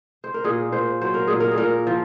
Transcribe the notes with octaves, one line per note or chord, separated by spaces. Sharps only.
C5
A#4
A#2 G#4
A#2 C5
F#3 C5
A#4
A#2 G#4
A#4
G#4
A#2 A#4
F3